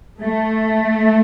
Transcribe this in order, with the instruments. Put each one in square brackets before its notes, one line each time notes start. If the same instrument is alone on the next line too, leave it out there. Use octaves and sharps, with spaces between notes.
[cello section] A3